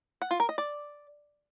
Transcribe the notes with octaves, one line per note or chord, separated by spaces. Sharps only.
F#5
F4
A#4
D#5
D5